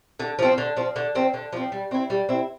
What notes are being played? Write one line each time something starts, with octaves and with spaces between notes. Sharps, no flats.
D3
F3 C4
D3
F3 C4
D3
F3 C4
D3
F3 C4
G3
C4 E4
G3
C4 E4